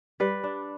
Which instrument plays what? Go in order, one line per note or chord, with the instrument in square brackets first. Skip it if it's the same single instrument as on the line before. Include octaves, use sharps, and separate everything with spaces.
[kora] G3 B4
D4